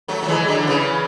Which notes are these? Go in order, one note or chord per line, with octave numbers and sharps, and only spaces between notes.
F#3 A3
F#3
E3 G#3
D3 F#3
C#3 E3